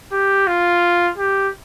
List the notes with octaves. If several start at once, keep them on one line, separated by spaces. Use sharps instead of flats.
G4
F4
G4